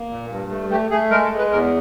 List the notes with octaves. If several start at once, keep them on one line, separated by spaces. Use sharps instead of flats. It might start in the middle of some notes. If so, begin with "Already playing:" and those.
Already playing: A#3
A#2
G2
A3
A3 G4
A3 G#4
G#3 A#4
A4
G#3
B4
E2 A#4